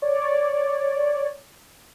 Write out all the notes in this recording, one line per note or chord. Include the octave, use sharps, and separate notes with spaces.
C#5 D5